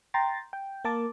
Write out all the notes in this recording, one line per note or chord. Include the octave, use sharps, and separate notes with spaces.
G5 A#5 C6 A6
G5
A#3 A#4 A5 D6